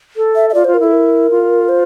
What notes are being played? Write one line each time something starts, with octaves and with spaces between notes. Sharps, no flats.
A4
E5
E5
F4 D5
F4 C5
A#4
E4 A4
A#4
F4
C5